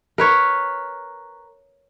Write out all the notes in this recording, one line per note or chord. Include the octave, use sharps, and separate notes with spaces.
A#4 B4 C#5